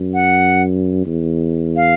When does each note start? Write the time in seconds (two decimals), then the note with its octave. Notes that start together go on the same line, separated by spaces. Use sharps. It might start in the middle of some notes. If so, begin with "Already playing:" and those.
Already playing: F#2
0.14 F#5
1.06 E2
1.76 F5